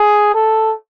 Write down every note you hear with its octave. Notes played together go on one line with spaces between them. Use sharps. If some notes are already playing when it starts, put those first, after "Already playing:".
Already playing: G#4
A4